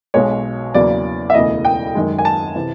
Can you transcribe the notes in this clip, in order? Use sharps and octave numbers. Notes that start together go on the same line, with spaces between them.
B1 B2 G#3 C#5
E2 C#3 F#3 A#3 D5
E5
E1 D2 C#3 E3 D#5
G5
F#2 D#3 G#3
G#5
A5
C3 E3